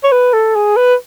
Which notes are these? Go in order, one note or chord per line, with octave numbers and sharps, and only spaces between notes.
C#5
B4
A4
G#4
B4